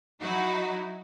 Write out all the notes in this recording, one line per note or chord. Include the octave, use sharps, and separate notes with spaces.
F#3 D#4 E4 F#4